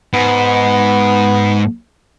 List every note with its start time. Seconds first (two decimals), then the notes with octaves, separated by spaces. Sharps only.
0.13 G#2 B3